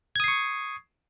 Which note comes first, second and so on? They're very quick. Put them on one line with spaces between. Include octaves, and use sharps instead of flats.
G#6 D#6 C7 C#6